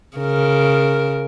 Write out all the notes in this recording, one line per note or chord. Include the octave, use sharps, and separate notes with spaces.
C#3 A#4